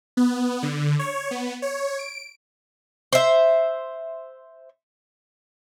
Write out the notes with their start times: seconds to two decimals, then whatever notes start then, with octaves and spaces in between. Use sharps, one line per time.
0.17 B3
0.63 D3
0.99 C#5
1.31 B3
1.62 C#5
1.99 D7
3.13 C5 E5